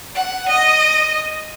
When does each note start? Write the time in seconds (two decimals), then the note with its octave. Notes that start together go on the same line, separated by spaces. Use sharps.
0.16 F#5
0.49 D#5